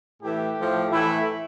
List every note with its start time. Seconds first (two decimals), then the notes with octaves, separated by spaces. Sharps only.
0.21 A2 E3 A3 G4
0.56 A2 F3 A3
0.90 A2 E3 A3 E4